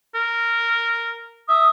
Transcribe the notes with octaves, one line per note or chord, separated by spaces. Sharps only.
A#4
E5 D#6